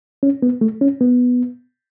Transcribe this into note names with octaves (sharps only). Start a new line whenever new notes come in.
C#4
B3
A3
C#4
B3